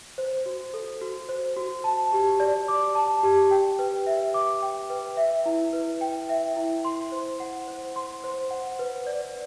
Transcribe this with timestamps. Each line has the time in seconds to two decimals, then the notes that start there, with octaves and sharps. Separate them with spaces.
0.18 C5
0.46 F#4
0.74 A4
1.01 F#4
1.29 C5
1.56 F#4
1.84 A5
2.13 G4
2.40 D5
2.68 D6
2.95 A5
3.23 G4
3.51 G5
3.79 B4
4.07 E5
4.34 D6
4.62 G5
4.90 B4
5.17 E5
5.46 E4
5.73 B4
6.01 G5
6.29 E5
6.56 E4
6.85 C6
7.12 C5
7.40 F#5
7.68 C5
7.96 C6
8.24 C5
8.51 F#5
8.79 B4
9.07 D5